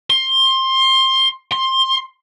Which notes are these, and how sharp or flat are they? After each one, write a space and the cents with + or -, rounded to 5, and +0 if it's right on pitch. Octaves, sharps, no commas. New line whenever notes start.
C6 +20
C6 +15